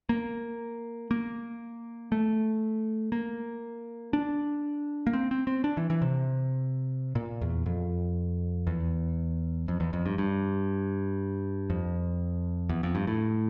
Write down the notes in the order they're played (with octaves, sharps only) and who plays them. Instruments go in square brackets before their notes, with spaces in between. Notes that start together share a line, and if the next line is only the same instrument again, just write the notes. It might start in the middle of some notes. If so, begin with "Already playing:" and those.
[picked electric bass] A#3
A#3
A3
A#3
D4
A#3
C4
C4
C4
D4
E3
E3
C3
A#2
E2
F2
E2
F2
E2
F2
G2
G2
F2
E2
F2
G2
A2